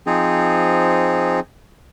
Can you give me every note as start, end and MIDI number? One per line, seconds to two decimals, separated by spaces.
0.06 1.40 53
0.06 1.40 60
0.06 1.40 63
0.06 1.40 68